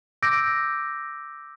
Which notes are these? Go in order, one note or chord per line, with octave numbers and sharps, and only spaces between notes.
D6 E6 G6 A#6 D7